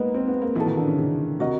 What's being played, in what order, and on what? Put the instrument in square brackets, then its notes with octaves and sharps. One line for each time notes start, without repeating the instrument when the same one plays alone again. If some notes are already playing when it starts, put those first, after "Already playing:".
Already playing: [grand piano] G#3 A#3 B3 [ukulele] D#4 B4 D#5
[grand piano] C4
B3
A#3
[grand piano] E3 [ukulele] D#4 F#4 A4
[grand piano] D#3
D3
C#3
C#3
[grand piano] C3 [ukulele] F#4 A#4 D#5